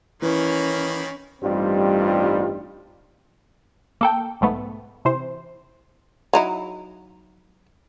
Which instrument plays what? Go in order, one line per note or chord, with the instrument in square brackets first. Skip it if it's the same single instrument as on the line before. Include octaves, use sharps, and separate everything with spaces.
[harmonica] D#3 A#3 B5 [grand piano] E3 [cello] C#4
[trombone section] A1 G2 G3 C4 D#4 F4
[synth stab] A#3 A4 G5
B1 G#2 A3 B3
C3 E3 C5
[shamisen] F#3 D#4 E4